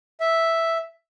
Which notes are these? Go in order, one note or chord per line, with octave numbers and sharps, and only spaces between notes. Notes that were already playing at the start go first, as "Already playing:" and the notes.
E5